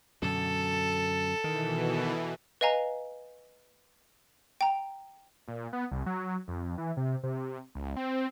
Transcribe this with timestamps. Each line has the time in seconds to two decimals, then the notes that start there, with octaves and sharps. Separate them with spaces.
0.22 F#2 B2 D3 A4
1.44 B2 D#3 E3
2.61 B4 D#5 F5 G#5 A#5
4.61 G5 A#5
5.48 A#2
5.73 B3
5.91 C2
6.06 F#3
6.48 F2
6.78 E3
6.97 C3
7.23 C3
7.75 C#2
7.97 C4